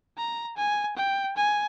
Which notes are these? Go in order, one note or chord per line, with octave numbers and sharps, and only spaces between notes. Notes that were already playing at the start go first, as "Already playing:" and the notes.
A#5
G#5
G5
G#5